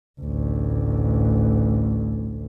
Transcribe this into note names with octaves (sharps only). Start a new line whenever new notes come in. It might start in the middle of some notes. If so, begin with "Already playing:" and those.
A1 D2